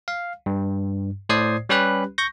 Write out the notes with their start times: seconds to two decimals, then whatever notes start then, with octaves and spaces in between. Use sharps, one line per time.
0.08 F5
0.46 G2
1.29 A2 C5 D5 D#6 G#6 C7
1.69 G3 C#4 G4 B4 B5 F#6
2.18 C#6 G6 A#6